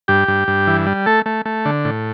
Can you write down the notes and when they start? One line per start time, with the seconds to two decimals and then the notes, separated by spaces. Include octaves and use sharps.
0.08 G2 G4
0.28 G2
0.48 G2
0.67 E3
0.87 G3
1.06 A3 A4
1.26 A3
1.46 A3
1.65 D3
1.85 A2